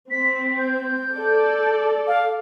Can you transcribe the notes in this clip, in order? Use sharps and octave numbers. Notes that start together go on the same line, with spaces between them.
C4 B6
G6
A4 D5
F5